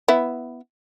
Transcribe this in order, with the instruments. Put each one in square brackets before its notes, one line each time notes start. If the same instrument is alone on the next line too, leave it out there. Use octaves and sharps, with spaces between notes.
[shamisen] B3 E4